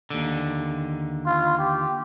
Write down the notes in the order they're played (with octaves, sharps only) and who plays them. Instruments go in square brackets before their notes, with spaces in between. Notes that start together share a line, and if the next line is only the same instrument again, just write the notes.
[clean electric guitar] D#2 D3
[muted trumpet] F4
G4